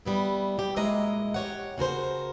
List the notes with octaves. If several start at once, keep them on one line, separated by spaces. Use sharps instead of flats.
G3 B3 E4
G4
F#2 A#2 G#3 E4 D#5 A#5
G4 C#5 F#5
C#3 F#4 A#4 C5